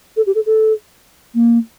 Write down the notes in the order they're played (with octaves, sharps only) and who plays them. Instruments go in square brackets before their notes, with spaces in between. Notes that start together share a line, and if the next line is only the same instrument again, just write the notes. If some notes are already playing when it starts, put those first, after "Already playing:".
[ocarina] A4
G4
A4
A4
A#3